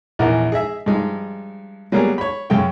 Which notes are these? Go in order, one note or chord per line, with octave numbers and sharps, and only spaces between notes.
A#1 E2 A#4 F#5
G#4 D#5 E5
G2 F3 G#3 D#4
F#3 G3 A#3 B3 G#4 A#4
C#5 B5
F#2 C#3 G#3 G5